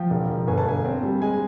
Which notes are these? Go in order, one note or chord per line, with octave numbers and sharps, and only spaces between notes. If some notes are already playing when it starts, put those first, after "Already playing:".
Already playing: F3 G5
E1
E1
G1 G#5
A5
G1 G#5
C4
G3
G#3 G#5